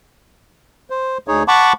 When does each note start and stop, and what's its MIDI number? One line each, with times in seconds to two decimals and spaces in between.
0.90 1.18 72
1.28 1.43 38
1.28 1.43 63
1.28 1.43 68
1.28 1.43 73
1.48 1.73 78
1.48 1.73 81
1.48 1.73 83
1.48 1.73 85
1.48 1.73 86